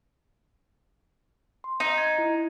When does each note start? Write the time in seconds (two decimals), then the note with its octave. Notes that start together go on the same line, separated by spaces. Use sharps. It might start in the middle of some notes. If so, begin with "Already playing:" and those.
1.64 C6
1.80 D#4
1.98 G#6
2.18 E4